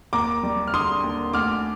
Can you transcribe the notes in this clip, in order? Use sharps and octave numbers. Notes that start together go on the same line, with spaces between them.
D#2 A#5 D6
G3
F6
D3 C6 D#6
D#2
D2 D6 F6